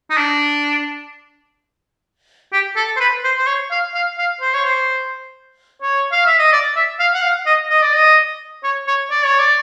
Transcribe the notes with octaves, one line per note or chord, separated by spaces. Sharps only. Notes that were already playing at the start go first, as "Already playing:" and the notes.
D#4
D4
G4
A4
C5
B4
C5
C5
C#5
F5
F5
F5
C5
C#5
C5
C#5
F5
E5
D#5
D5
E5
F5
F#5
F5
D#5
D#5
D5
D#5
C#5
C#5
D5
C#5
D5